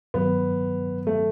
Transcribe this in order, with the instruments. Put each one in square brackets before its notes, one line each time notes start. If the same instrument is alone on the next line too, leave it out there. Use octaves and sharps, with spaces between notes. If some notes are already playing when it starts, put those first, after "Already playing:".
[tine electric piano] G2 D#3 F#3 [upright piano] B3
[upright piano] A3